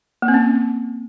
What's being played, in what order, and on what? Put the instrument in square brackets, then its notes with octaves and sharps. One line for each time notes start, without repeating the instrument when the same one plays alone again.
[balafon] A#3
C4
C#4